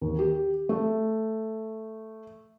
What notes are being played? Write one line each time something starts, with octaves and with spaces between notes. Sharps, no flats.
D#2
G4
A3